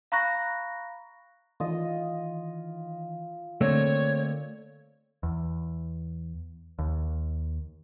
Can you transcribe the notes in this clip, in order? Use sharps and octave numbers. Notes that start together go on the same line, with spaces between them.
F5 A#5 B5 C#6 F#6 A#6
D#3 E3 F4 D#5
D3 A3 A#3 C4 C#5 D5 G#6
E2
D#2